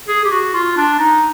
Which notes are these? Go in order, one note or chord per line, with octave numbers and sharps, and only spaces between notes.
G#4
G4
F#4
F4
D4
D#4